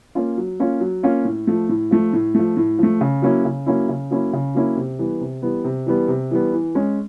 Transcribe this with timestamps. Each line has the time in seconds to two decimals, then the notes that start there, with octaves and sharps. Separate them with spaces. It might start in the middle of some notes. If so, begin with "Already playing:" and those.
0.15 A#3 C#4 F4
0.37 F#3
0.60 A#3 C#4 F4
0.80 F#3
1.03 A#3 C#4 F4
1.25 A2
1.47 F3 A3
1.69 A2
1.91 F3 A3
2.13 A2
2.35 F3 A3
2.57 A2
2.79 F3 A3
3.01 C#3
3.22 F#3 A#3 C#4 E4
3.45 C#3
3.66 F#3 A#3 C#4 E4
3.89 C#3
4.11 F#3 A#3 C#4 E4
4.33 C#3
4.55 F#3 A#3 C#4 E4
4.77 C3
4.99 E3 G3 B3
5.21 C3
5.42 E3 G3 B3
5.65 C3
5.86 E3 G3 B3
6.08 C3
6.31 E3 G3 B3
6.53 E3
6.75 G#3 C#4